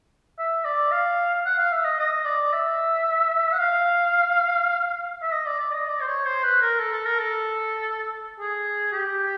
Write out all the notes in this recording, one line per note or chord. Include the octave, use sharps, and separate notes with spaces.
E5
D5
F5
F#5
F5
E5
D#5
D#5
D5
E5
F#5
F5
E5
D#5
D5
D5
D#5
D5
C5
C#5
C5
B4
A#4
A4
A4
A#4
A4
G#4
G4